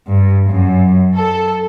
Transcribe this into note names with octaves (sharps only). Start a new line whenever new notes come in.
G2
F#2
A4